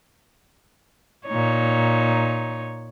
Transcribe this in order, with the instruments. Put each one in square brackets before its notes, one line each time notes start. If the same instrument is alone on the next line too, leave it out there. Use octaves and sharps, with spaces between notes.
[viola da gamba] A#2 D#4 C#5